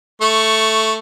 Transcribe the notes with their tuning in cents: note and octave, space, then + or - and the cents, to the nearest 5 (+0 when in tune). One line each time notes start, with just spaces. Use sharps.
A3 +0 C#6 +0